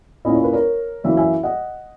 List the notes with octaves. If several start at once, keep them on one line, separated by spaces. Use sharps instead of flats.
A#2 A#3 C#4 E4 D#5
C#5
B4
A#4 C#5
F#2 E3 A#3 C#5 E5
E5 G#5
D#5 F#5